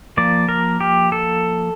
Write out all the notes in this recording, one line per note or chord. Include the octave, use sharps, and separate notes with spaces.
F3 A#3 D5
A#4
G4
A4